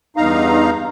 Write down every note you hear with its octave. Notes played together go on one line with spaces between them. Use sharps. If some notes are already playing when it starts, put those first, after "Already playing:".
E2 G2 D#4 F5 A#5